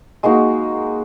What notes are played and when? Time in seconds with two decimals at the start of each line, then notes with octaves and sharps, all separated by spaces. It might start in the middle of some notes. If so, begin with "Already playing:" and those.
0.23 G#3 A#3 D#4 F#4